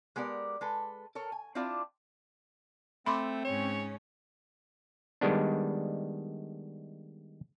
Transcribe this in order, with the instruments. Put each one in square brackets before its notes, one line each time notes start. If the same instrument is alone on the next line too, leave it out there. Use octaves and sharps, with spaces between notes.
[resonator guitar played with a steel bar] G#3 B3 G4 A#4 D5
G#3 A4 B4
A4 A#4 C#5
G#5
C4 D4 E4 F4 D5
[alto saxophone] A3 [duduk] C4 [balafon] B5 C6 D6
[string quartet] G#2 C#3 C#4 [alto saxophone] C#5
[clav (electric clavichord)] D#3 G3 G#3 B3 D4